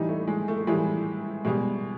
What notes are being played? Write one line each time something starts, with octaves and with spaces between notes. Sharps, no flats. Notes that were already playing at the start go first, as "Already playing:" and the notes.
Already playing: A2 E3 G3 D#4
A3
G#3
A3
A2 E3 G3 G#3
B2 G3 G#3